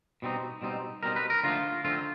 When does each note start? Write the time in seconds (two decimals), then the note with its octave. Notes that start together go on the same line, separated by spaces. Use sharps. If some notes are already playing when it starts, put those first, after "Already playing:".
0.22 B2 G3 C4 D#4
0.62 B2 G3 C4 D#4
1.03 B2 G3 C4 D#4 A#4
1.16 B4
1.30 A#4
1.43 D3 F3 A3 C4 D#4 F4
1.84 D3 F3 A3 C4 D#4 F4